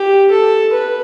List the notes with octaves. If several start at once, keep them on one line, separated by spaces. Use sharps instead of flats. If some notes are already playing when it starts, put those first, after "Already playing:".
Already playing: G4
A4
B4